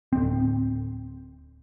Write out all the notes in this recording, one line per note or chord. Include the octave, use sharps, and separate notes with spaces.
D1 C4